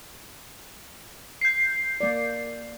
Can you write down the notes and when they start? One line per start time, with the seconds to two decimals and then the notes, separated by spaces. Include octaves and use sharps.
1.41 G6 C7
2.00 A#3 D5